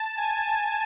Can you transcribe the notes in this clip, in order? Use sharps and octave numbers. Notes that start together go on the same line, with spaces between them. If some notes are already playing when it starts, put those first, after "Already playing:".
Already playing: A5
G#5